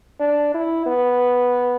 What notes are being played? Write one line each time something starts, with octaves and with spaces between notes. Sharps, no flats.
D4
E4
B3